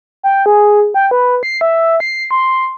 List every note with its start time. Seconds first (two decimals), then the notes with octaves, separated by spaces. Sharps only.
0.23 G5
0.46 G#4
0.94 G5
1.11 B4
1.43 C7
1.61 E5
2.00 C7
2.31 C6